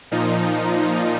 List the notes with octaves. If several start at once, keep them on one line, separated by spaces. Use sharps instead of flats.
A#2 F3 D#4